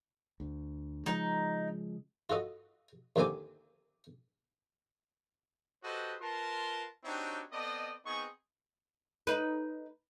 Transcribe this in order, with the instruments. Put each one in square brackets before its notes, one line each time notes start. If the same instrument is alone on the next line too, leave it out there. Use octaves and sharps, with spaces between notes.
[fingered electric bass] D2
[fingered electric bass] C#3 F3 G#3 [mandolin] D#4
[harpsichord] F4 F#4 A4 D#5
D#2 A#2 D3 C4 G#5 D6
[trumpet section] F#4 G4 A4 B4 C5 D#5
F4 A#4 B4 A5 C6
C4 D4 D#4 F#4 G4 C#5
B3 C4 A4 D5 D#5
B3 C4 D#4 G#4 D#5 C#6
[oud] D#4 B4